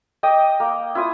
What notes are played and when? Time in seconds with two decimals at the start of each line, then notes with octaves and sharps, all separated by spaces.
0.23 D#5 G5 D6 D#6
0.60 A#3
0.95 E4 F4 D#6